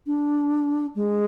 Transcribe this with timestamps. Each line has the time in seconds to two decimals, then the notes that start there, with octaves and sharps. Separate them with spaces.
0.06 D4
0.95 G#3